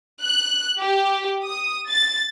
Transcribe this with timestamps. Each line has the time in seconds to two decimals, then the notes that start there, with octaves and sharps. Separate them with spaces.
0.22 F#6
0.80 G4
1.45 D#6
1.90 A6